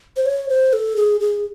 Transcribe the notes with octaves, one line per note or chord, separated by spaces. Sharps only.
C5
C#5
C5
A4
G#4
G#4